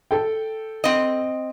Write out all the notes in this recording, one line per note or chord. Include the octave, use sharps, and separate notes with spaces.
A4 G5
C4 D#5